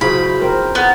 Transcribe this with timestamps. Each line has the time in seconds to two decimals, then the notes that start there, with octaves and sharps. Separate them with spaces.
0.01 C#3 F#3 E4 F4 C5 B5
0.42 C4 A#4 C5
0.75 B3